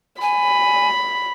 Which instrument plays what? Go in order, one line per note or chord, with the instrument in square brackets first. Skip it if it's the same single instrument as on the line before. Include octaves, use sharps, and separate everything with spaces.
[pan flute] G#5 [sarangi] B5